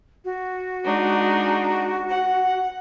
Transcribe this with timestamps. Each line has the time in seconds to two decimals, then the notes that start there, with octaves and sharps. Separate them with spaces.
0.25 F#4
0.84 G#3 D4 D#4
2.09 F#5